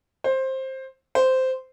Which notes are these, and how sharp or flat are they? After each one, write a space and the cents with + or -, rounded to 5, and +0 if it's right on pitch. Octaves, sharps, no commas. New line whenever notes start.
C5 +15
C5 -10